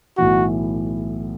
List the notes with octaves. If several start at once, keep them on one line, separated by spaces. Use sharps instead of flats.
B1 A2 E3 F#4